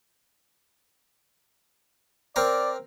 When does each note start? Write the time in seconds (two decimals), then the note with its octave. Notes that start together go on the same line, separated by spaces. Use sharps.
2.36 C4 A#4 D5 A#5